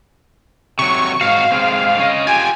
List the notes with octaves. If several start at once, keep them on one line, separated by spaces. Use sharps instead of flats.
C3 F#3 C#6
G#2 F#4 F5
C3 G#3 C4
C#4 D#5
F4 G4 G#5